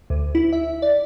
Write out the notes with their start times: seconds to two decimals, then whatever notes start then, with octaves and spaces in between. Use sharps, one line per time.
0.10 D2
0.35 E4
0.53 E5
0.82 D5